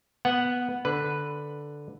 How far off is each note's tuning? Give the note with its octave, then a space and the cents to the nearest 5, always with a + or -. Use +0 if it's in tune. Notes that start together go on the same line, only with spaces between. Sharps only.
B3 -5 F#5 +0
D3 +0 B4 +0